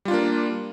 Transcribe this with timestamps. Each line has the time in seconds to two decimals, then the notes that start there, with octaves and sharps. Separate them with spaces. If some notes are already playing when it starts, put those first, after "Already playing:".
0.05 G3
0.08 F4
0.11 D4
0.14 A#3